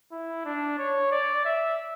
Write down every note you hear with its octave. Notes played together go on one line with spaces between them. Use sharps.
E4
D4
C#5
D5
E5